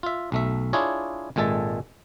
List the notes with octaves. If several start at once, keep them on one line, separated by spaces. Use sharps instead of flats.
F4 E5
B1 A3 E5
D4 E4 F4 G#4 C#5
G#1 A#2 G#3 A4 E5 A5